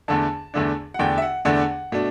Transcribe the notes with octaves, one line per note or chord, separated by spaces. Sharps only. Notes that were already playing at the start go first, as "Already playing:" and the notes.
E2 D3 A3 D4 A5
E2 D3 A3 D4
F#5
E2 D3 A3 D4 G5
E5
F#5
E2 D3 A3 D4 F#5
B2 A3 D4